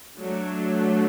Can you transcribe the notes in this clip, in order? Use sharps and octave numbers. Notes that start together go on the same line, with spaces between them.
F#3 A3 D4